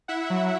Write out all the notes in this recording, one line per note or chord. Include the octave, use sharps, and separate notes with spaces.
E4 E5 F#5
F#3